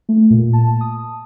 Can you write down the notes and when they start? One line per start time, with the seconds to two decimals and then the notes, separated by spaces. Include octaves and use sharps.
0.09 A3
0.31 A#2
0.53 A5
0.81 D#6